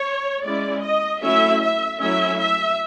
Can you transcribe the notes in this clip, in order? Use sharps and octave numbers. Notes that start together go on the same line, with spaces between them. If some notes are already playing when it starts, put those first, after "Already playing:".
Already playing: C#5
G#3 C#4 E4 D5
D#5
F#3 A3 C#4 E4 E5
E5
F#3 A3 C#4 E4 E5
E5